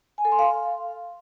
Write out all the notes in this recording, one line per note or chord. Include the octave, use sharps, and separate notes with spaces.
G#5
A4
C6
F5